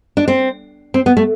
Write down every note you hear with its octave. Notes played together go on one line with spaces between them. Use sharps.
D4
C4
C4
B3
A3